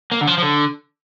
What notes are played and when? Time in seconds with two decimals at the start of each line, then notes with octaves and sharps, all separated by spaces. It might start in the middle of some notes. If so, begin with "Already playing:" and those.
0.12 A#3
0.21 D3
0.27 F3
0.38 F3
0.42 D3